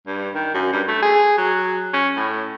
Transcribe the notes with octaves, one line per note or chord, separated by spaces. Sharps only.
G2
D#3
F#2
G2
A3
G#4
F#3
C#4
A2